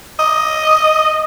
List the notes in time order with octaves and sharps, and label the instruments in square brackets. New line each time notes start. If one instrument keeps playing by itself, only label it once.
[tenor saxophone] D#5